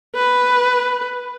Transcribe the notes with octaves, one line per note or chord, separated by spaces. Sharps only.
B4